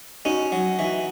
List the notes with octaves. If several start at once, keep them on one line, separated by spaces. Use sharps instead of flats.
C#4 D#4 F#4
F#3
E3 D#4 F#4